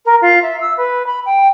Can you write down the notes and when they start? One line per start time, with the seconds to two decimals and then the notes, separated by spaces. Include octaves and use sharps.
0.05 A#4
0.21 F4
0.42 E5
0.61 E6
0.77 B4
1.07 B5
1.26 G5